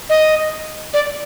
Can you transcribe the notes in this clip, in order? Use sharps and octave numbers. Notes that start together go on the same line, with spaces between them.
D#5
D5